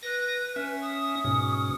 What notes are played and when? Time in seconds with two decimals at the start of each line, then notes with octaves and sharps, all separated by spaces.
0.03 B4 A#6
0.56 C#4 E5
0.82 D#6
1.25 G#2 B2 C#4